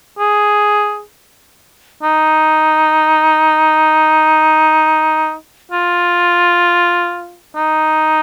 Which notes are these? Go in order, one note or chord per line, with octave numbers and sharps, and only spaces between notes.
G#4
D#4
F4
D#4